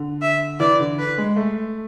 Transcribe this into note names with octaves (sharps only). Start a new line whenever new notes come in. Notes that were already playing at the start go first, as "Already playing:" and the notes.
Already playing: D3
E5
E3 D5
D3
B4
G#3
A3